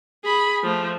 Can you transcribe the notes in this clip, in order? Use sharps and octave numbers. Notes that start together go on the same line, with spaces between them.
G#4 B5
F3 A3